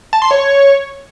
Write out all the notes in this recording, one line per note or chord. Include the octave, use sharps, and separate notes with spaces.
A5
C6
C#5